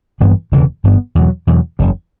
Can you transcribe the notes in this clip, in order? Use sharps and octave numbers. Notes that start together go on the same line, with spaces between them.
A1 G2 E3 B3
E1 D2 C#3 E3
G1 G2 E3 B3
E2 B2 F#3
E2 B2 F#3
F#1 E2 C#3